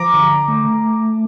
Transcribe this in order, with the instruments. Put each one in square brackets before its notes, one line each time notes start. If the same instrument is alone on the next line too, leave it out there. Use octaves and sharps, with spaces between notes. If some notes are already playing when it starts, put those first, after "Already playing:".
Already playing: [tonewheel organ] F3 [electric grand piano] A#5 D6
[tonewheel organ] D3
A3